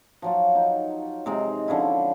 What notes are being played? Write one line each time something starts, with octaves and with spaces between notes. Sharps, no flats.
F3 F#3 F4
D#4
C3 G#3 D#4
D3 F3 C#4 E4